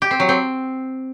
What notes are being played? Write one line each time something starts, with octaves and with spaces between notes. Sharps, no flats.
G4
C4
F#3
C4